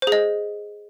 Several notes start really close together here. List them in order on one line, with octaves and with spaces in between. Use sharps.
C5 G#4 D#5